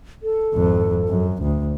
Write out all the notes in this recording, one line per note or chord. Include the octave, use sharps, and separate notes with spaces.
A4
G#1 F2
F#2
D2